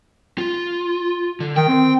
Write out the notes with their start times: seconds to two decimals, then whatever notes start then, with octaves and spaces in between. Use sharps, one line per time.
0.38 F4
1.40 D3
1.56 D#3 G5
1.68 C4